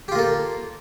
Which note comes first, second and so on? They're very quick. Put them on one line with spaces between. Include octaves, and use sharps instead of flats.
G4 F4 A#3 A4